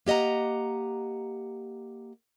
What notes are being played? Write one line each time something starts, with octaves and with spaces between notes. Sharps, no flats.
A#3 G4 D#5 F#5 A#5